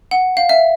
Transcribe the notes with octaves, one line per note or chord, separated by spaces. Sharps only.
F#5
F5
E5